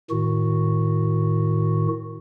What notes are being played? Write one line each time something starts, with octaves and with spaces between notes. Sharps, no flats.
A2 D#3 F#4